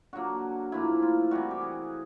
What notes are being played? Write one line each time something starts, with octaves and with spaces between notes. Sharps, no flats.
D3 F#3 A#3 F#4
A2 F3 A#3 E4
F4
C3 E3 G3 F#4
G4
G#4